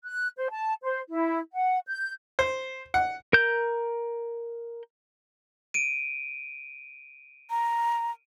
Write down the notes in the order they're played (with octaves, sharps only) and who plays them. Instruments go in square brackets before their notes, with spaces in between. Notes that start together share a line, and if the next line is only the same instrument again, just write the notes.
[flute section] F#6
C5
A5
C5
E4
F#5
G6
[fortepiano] C5
F#5
[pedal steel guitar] A#4 G6
[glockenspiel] D7 D#7
[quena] A#5